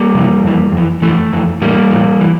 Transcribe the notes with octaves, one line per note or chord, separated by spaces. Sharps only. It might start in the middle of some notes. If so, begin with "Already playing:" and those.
Already playing: G3 A#3
F2 C3 E3
F2 E3
F2
E3
F2 E3 A3
F2 E3
A2 E3 G3 A#3
A2 E3
E3